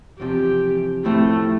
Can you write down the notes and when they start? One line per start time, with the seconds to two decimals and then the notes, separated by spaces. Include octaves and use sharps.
0.20 E2 C3 F3 G4
1.04 A2 F3 A3 C4 G4